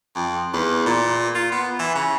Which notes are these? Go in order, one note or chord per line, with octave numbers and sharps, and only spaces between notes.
F2
E2
A#2
F4
B3
E3
C#3